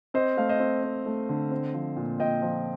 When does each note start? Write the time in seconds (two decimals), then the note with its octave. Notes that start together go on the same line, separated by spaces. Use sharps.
0.14 C4 C5 D#5
0.37 A3 F5
0.49 C5 D#5
0.60 C4
0.83 C4
1.06 A3
1.29 D3
1.51 C4
1.74 F3
1.97 A#2
2.19 A#2 D#5 G5
2.42 F3